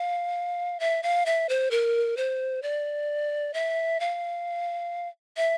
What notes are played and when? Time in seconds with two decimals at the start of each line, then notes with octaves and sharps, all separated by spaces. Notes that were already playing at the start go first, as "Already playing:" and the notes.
Already playing: F5
0.80 E5
1.03 F5
1.26 E5
1.49 C5
1.71 A#4
2.17 C5
2.63 D5
3.54 E5
4.00 F5
5.37 E5